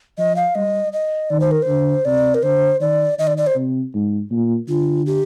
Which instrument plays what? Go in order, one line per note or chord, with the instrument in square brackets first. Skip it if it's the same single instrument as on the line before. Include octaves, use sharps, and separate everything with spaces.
[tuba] F3 [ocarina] D#5
[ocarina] F5
[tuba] G3 [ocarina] D#5
[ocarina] D#5
[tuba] D#3 [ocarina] D5
[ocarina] C5
A#4
[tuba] D3 [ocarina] C5
[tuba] C3 [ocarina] D5
[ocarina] A#4
[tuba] D3 [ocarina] C5
[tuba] D#3 [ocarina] D5
[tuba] D#3 [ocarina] D#5
[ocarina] D5
D5
C5
[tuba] C3
G#2
A#2
[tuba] D3 [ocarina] F4
[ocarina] G4